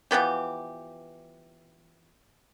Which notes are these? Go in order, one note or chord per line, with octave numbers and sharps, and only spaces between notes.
E3 F3 B3 G4